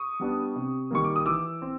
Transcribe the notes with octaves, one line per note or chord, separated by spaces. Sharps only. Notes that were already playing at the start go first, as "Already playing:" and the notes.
Already playing: C#6 D#6
G3 B3 D4
C3
D#3 G3 A#3 C#6
D6
D#6
E3 D6 E6
C4